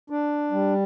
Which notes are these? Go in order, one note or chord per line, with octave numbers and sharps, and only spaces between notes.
D4
G3